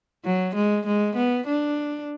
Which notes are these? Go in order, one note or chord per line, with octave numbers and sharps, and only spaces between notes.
F#3
G#3
G#3
B3
D4